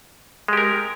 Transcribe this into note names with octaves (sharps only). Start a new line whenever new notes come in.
G#3 G4 A#4